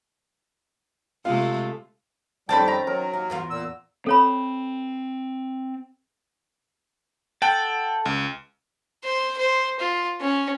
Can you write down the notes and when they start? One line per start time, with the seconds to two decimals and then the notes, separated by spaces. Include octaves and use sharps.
1.25 C3 G#3 A3 F4
2.49 F2 D#3 G3 C4 C#4 G5 A5 B5
2.68 A#5
2.87 F#3 A#4
3.13 D#2
3.30 E2 B3 F4
3.50 A#2 E6
4.07 C4 A4 C#5 B5
7.42 A4 F#5 G5 A5
8.05 C#2
9.04 C5
9.38 C5
9.79 F4
10.20 C#4